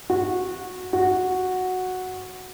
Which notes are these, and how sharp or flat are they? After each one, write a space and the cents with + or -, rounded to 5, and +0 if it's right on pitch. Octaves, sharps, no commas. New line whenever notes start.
F#4 -15
F#4 -5